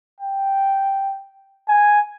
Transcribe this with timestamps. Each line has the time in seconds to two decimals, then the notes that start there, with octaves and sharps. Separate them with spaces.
0.21 G5
1.69 G#5